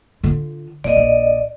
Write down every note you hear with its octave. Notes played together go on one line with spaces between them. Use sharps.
D3 F4
A#2 C4 D5 D#5
A#1